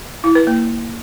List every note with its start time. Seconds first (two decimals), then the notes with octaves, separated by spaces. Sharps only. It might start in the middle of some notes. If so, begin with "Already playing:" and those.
0.24 E4
0.35 B4
0.47 A#3